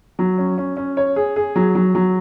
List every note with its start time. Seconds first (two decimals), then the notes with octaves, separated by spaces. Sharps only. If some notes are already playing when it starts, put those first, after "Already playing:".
0.19 F#3
0.38 C#4
0.58 C#4
0.77 C#4
0.97 C#5
1.16 G#4
1.36 G#4
1.56 F#3
1.75 F#3
1.95 F#3